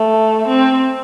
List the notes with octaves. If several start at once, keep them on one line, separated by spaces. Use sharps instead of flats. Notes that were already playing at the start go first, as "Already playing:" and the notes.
Already playing: A3
C4